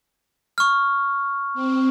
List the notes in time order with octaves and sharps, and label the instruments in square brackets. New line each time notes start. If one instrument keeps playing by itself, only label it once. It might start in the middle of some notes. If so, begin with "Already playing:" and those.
[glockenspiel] C#6 F6
[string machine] C4